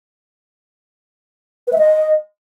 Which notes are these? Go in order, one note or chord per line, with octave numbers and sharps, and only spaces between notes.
B4
E5
D#5